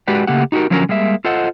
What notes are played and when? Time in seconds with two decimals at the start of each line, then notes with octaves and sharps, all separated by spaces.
0.08 G#3 F#4 G4 B4 D5
0.27 C#3 A3 A#3 G4 F#5
0.52 D#4 F#4 G4 A4 A#4
0.70 D3 F3 F#3 C#4 G#4 A#4
0.89 G3 G#3 A#3 E5
1.25 F4 A4 C5 D#5 F#5